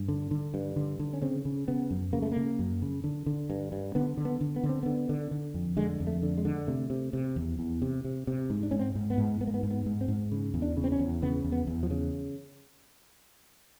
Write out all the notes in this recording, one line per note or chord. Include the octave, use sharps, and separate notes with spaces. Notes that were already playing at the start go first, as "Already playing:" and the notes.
Already playing: G2
D3
D3
G2
D3
D3
C#4
C#3 C4
C#3
C#3 B3
F#2
C#3 A#3
A3
C#3 A#3
F#2
C#3
D3
D3
G2
G2
D3 B3
D3
B3
D3
B3
D3
C4
D3 B3
D3
D3
F2
D3 G#3
F2
A3
D3
G#3
D3
C3 A3
C3
C3
E2
E2
C3
C3
C3
G#2
D4
G#2 C#4
C4
G#2
B3
G#2
G#2 B3
A#3
B3
G#2
B3
G#2
C4
G#2
C#3
E2
D4
C#3
C4
C#4
E2
C#3 B3
E2
B3
E2
F3
C#3